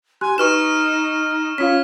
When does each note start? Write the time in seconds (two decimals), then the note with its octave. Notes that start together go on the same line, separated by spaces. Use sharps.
0.21 G4 G#5 C6 F#6
0.38 D#4 F#4 B4 C#6 F6 E7
1.58 C#4 F4 C#5 F5 B6